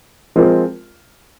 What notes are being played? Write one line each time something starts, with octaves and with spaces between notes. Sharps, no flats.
F3 G#3 C4 F4 A#4